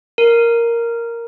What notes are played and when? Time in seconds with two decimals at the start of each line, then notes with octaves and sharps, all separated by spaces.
0.18 A#4